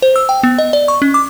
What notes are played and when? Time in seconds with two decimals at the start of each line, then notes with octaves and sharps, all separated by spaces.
0.02 C5
0.16 E6
0.29 G5
0.43 B3
0.58 D#5
0.73 D5
0.88 C#6
1.02 C#4
1.14 D6